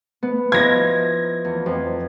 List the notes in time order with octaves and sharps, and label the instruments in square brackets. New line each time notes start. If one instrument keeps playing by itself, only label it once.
[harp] B3
[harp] F3 D#4 E4 [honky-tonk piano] G#6 A#6
[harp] E2
F2